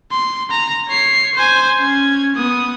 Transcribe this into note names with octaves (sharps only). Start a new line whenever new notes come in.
C6
A#5
C#5 C7
C5 G#5
C#4 G#6
B3 D#6